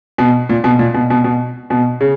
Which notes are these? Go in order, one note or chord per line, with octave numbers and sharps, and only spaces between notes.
B2
A#2
B2
A#2
B2
B2
B2
B2
C#3